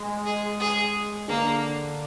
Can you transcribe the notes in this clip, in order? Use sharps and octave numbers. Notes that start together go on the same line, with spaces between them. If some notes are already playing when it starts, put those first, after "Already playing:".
Already playing: G#3
G#4
G#4
D3 A#3